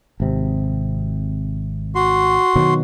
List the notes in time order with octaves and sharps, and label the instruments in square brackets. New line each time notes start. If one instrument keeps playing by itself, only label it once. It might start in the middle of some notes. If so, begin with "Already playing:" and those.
[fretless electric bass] G#1 C3
[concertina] F#4 C6
[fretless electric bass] B2 D#3 F#3